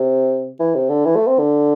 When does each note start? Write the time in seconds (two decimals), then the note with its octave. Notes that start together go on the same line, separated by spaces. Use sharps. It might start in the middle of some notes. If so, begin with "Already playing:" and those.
Already playing: C3
0.60 E3
0.75 C3
0.89 D3
1.05 E3
1.16 A3
1.27 C4
1.39 D3